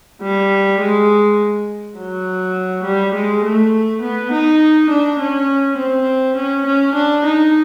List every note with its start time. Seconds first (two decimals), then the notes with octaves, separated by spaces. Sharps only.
0.22 G3
0.80 G#3
1.97 F#3
2.84 G3
3.14 G#3
3.44 A3
4.02 B3
4.32 D#4
4.90 D4
5.19 C#4
5.78 C4
6.36 C#4
6.66 C#4
6.95 D4
7.25 D#4